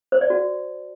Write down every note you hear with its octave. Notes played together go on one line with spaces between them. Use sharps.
C5
D5
F#4